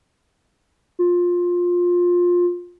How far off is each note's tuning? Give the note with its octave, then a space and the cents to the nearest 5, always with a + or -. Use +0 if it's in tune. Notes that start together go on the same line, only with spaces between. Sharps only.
F4 +15